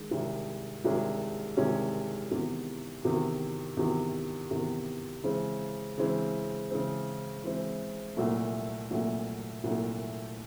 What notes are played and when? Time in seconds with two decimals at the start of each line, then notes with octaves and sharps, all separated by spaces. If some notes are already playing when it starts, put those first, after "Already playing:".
Already playing: D#3 G#3
0.11 C2 C3 D#3 G#3 C#4
0.84 C2 C3 D#3 G#3 C#4
1.57 C2 C3 D#3 G#3 C#4
2.31 E2 C3 D#3
3.05 E2 C3 D#3
3.77 E2 C3 D#3
4.51 E2 C3 D#3
5.24 C#3 E3 G#3 C4
5.97 C#3 E3 G#3 C4
6.71 C#3 E3 G#3 C4
7.44 C#3 E3 G#3 C4
8.17 C2 A#2 F#3 A3
8.91 C2 A#2 F#3 A3
9.64 C2 A#2 F#3 A3